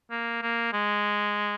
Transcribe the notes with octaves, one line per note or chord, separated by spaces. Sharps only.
A#3
A#3
G#3